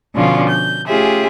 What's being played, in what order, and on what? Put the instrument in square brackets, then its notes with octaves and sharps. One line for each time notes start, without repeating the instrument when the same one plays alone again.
[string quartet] B2 D3 F3 C#4 D4 F4
G6
A3 C#4 F4 G4 G#4 E5